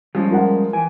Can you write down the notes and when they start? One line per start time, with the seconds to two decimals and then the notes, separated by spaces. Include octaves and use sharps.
0.15 F3 G3 G#3 C#4
0.30 F4 A#4 F#5
0.73 E3 G5 G#5